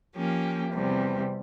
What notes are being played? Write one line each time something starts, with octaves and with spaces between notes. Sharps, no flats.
F3 A#3 C#4 G4
E2 C3 G3 C4